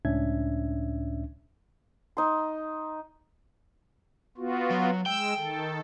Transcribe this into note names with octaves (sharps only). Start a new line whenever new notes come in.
C#2 A2 C#4 D4 E5 G#6
D#4 C6
B3 F4 F#4
F#3
G#3 G5 E6
D#3 A4